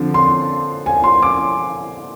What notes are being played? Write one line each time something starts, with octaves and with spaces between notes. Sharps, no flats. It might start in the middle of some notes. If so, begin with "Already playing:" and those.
Already playing: D3 F3 C4
C6
G#5
C6
D6